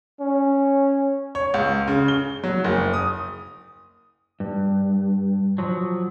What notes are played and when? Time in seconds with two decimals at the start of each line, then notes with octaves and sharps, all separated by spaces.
0.20 C#4
1.35 C#5
1.54 C#2
1.88 C#3
2.08 G7
2.44 F#3
2.64 F#1
2.93 D#6
4.40 G2
5.58 F3 F#3